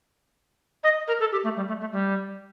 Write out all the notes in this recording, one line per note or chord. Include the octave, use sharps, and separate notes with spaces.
D#5
A#4
A4
G4
A3
G3
A3
A3
G3